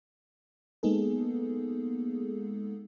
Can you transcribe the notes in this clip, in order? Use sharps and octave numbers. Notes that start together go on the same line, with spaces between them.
G#3 A#3 B3 D#4 G#4 A4